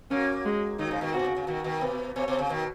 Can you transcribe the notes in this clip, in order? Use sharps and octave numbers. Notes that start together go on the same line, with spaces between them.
F#3 A#3 C#4
G#3
D#3 F#3 D#4
C#3 F3
B2 D#3
B2 F#4
C#3
C#3
B2 D#3 F#4
B2 D#3
B2 B4
B2 C#5
B2
C#3
B2 D#3